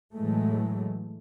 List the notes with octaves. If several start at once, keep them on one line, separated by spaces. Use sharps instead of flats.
A2 E3 F#3 G#3 A3